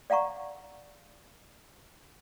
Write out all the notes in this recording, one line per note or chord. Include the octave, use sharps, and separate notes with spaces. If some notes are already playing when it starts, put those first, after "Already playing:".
D5 F5 F#5 A#5 C#6